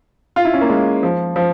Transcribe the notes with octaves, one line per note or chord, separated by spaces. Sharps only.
F4
E4
C#4
A#3
G#3
F3
F3